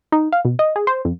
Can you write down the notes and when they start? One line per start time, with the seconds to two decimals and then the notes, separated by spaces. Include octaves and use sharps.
0.12 D#4
0.33 F5
0.45 B2
0.59 D#5
0.76 G#4
0.87 C5
1.05 F2